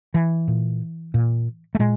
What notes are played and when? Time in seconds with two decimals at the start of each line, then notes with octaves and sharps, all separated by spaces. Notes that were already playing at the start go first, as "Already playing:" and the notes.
0.14 E3
0.48 A#2
1.14 A#2
1.75 A3
1.79 A#2 G#3